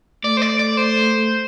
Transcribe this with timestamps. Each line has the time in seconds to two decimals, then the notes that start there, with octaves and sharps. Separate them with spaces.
0.24 A3 D5
0.37 C5
0.42 D5
0.59 D5
0.77 C5